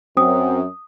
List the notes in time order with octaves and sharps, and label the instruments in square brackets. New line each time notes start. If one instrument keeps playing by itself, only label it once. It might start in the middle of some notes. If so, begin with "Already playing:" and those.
[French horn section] F#2 [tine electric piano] C4 [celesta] D#6